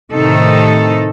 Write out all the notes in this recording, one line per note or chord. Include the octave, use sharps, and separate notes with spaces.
A2 C3 D#3 D#4 A4